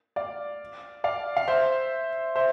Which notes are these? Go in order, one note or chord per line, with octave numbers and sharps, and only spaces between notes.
D5 F5
D5 F5
F5
C5 E5
C5 E5